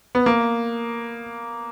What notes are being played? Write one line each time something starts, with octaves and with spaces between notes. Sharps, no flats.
B3
A#3